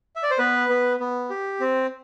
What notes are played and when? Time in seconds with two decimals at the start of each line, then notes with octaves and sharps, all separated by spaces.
0.16 E5
0.23 D5
0.31 C5
0.38 B3 B4
0.69 B3
1.00 B3
1.30 G4
1.60 C4